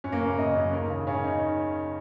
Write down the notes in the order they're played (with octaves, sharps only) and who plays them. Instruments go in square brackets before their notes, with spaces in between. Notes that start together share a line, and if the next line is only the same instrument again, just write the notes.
[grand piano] F#2 C#4
A#3
C#3 C#4
C#3 D#5
F#2
D#2 A#4
C#3
C#3 C#4
D#4